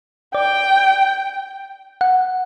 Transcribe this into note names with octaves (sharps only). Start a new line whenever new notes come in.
D5 G5
F#5